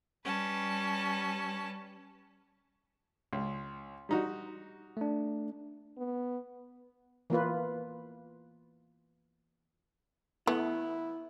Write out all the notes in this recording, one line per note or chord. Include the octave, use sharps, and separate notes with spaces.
G3 C#4 B4 A5
C#2 C6
G3 D#4 F#4
A3 D4
B3
E3 A#3 F4 B4
E3 A3 B3 E4